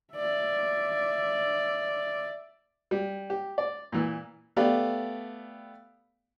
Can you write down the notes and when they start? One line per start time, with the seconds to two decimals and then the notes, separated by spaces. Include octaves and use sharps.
0.14 D5 E5
2.91 G3
3.30 G4
3.58 D5
3.92 A#2 E3
4.56 A3 B3 G4 D5 F5